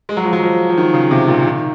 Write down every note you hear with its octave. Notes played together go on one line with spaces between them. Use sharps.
G#3
F#3
F3
F#3
F3
F3
D#3
C#3
C3
A#2
D#3